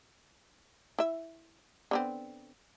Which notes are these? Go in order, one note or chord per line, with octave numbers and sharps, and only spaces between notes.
E4 E5
D3 B3 C4